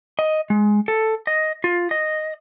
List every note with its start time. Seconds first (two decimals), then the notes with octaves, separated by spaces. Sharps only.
0.19 D#5
0.50 G#3
0.88 A4
1.27 D#5
1.64 F4
1.91 D#5